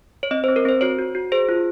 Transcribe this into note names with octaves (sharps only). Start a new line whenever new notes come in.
C#5
C4 D#5
C5
C4
A#4
C4 C5
F#4 C#5
F#4
F#4
G#4 C5
F4